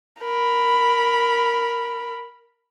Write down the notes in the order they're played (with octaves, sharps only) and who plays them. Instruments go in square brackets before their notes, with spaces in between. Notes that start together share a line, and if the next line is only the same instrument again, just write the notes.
[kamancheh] A#4 B5